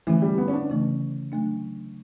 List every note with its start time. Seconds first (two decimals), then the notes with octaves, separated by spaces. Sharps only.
0.07 D3 E3 A3 C#4 E4
0.22 G3
0.38 B3
0.48 C#4
0.54 D4
0.69 C#3 E3 A3 C#4
1.32 F#3 A3 D4